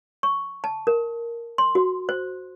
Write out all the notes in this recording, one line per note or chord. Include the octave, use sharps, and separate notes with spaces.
C#6
A5
A#4
C6
F#4
C5